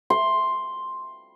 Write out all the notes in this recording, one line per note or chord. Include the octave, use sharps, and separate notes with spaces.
C6